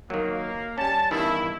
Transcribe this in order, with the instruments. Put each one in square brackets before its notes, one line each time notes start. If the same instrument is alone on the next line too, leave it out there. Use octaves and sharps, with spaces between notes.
[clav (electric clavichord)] D#3 F#3 [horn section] A#3
[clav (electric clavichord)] G3 C#4 [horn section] A5
[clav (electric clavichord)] E2 G2 D#3 [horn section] E4